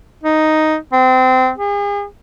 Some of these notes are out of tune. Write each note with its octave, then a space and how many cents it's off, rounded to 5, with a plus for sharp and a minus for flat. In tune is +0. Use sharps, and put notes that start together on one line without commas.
D#4 +0
C4 -25
G#4 -40